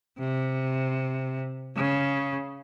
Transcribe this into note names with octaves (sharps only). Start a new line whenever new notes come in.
C3
C#3